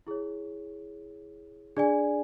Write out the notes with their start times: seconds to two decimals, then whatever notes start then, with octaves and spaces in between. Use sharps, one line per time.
0.07 E4 G#4 C#5
1.77 D4 G#4 D5 G#5